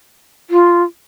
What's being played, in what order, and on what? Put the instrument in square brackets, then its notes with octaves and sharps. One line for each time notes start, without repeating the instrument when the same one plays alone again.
[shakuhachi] F4